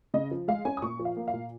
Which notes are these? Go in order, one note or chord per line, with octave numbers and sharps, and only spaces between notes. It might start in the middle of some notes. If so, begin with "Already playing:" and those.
C#3 D#5
F3
G#3 F5
C#4 G#5
D#6
A#2 C#6
F3
F5
A#3
F5
A#2